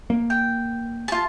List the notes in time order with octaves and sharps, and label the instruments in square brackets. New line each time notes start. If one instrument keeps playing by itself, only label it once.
[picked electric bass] A#3
[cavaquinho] G5
F4 A5